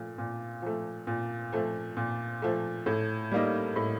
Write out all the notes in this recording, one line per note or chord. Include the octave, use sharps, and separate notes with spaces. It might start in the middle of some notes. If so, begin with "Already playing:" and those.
Already playing: A#2 F3 A3
A#2
F3 A3
A#2
F3 A3
A#2
F3 A3
A2
G3 A#3 D#4
A2